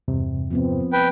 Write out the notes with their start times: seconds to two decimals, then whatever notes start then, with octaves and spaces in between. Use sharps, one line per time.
0.08 E2 G2 C3
0.51 F3 B3 C4
0.93 B4 G5